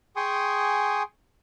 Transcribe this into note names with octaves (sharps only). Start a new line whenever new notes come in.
G#4 G5 G#5 C6 C#6 D#6